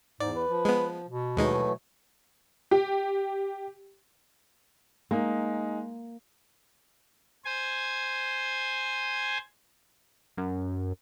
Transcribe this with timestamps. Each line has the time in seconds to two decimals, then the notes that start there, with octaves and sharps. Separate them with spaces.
0.20 E2 G#2 D5
0.35 B4
0.49 F3
0.65 G#3 B3
1.08 B2
1.37 D#2 E3 F#3 G#3 A3 D#4
2.71 G4
5.11 G#3 A#3 D#4
7.45 C5 G#5
10.37 F#2